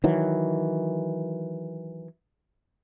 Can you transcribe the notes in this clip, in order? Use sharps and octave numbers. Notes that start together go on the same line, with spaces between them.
D#3 E3 F#3